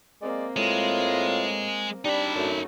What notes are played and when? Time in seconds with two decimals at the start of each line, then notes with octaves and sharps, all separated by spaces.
0.22 G#3 A#3 C4 D5
0.57 A2 G#3 F4
2.05 G3 D4 D#4 B5
2.35 F#2 A3 F#4